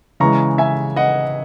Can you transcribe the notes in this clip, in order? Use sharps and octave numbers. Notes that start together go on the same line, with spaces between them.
C#3 E3 G#3 A#5 C#6
E5 G#5
D#5 F#5